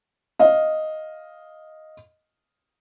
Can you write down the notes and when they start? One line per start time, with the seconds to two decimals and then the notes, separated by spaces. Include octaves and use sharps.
0.39 D#5 F5